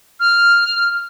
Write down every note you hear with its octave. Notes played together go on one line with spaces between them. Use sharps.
F6